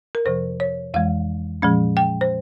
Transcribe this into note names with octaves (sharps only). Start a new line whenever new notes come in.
A#4
F2 C3 F3 C5
C#5
F2 E3 G#3 F5
A#2 F3 G#3 C#4
G5
C5